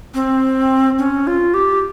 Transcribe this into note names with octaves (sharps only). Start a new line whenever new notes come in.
C4
C#4
F4
G4